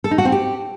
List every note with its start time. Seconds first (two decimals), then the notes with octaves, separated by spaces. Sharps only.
0.04 A4
0.11 D#4
0.18 F#4
0.25 C4
0.32 G4